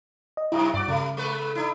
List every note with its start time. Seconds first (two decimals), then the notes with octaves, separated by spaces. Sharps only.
0.37 D#5
0.52 F#2 C3 E4 A#5 D#6
0.74 G2 F#4 D5 D6
0.88 C#3 G3 A3
1.17 G#3 A3 B4
1.55 D4 E4